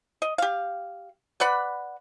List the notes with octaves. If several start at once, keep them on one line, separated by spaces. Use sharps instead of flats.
D#5
G4 F5
B4 D5 F#5 B5